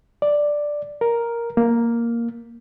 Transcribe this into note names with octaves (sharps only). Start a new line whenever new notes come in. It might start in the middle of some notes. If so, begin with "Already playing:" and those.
D5
A#4
A#3